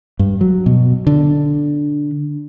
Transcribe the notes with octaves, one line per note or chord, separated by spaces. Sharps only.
G2
F#3
B2
D3